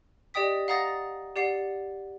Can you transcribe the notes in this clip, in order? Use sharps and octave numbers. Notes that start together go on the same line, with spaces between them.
G4 D5 D#5 G5 D#6 B6
F5 F#5 A#5 D#6 A6 A#6
G4 D5 F#5 C7